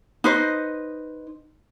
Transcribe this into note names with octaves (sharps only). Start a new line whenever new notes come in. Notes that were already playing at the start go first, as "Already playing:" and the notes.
D#4 B4 C5 D#5